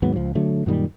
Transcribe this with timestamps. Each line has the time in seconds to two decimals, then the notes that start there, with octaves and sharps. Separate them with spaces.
0.02 D#2 G#2 F#3 B3
0.16 C#2 F3
0.35 D3 F#3 A3
0.66 F#2 A#2 D#3 G3